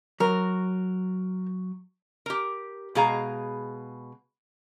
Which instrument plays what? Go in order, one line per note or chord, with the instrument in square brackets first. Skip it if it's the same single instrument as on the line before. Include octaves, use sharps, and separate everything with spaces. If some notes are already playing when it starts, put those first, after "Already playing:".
[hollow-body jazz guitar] F#3 [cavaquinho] A#4
[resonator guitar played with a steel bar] G4 A#4
B2 G#3 G#4 F5 A#5